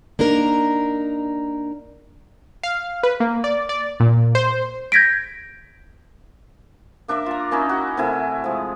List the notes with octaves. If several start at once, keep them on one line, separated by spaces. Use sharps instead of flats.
A#3 D4 D#4 A#4
F5
B4
A#3
D5
D5
A#2
C5
G6 G#6 A#6 B6 D7
A#3 D4 A#4 E5
F4 A#5
A#3 C#4 D#4 E4
F#4
C3 A3 E4 G#5
F3 G#3